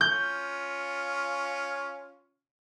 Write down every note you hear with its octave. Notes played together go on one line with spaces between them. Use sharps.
C#4 F4 G6